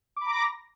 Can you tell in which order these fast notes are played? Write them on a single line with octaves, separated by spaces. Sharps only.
D6 B5 A#5 A#6